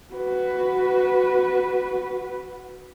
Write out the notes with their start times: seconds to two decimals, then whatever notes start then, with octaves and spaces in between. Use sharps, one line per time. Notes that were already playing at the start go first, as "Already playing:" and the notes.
0.13 F#4 B4